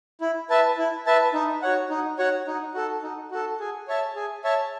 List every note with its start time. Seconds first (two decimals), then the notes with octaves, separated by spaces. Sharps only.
0.21 E4
0.50 B4 E5 A5
0.78 E4
1.06 B4 E5 A5
1.33 D#4
1.62 F#4 C#5 F#5
1.90 D#4
2.18 F#4 C#5 F#5
2.47 D#4
2.74 F#4 A4
3.03 D#4
3.31 F#4 A4
3.60 G#4
3.88 C#5 E5 A5
4.16 G#4
4.44 C#5 E5 A5